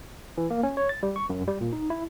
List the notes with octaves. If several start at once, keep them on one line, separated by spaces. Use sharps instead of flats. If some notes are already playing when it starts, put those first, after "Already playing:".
E3
A#3
C#4
C#5
A6
G3
C#6
F#2
G3
A#2
D#4
E4